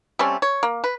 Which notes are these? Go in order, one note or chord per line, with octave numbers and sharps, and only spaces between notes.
G3 A3 C4 C#4
C#5
A#3
B4